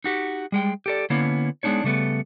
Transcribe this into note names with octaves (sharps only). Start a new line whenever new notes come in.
D#4 F#4 G4
G3 G#3 G5
G4 A4 D5
D3 A#3 B3 C#4 E4
G#3 B3 D4 D#4 C#5
C#3 G3 A3 B3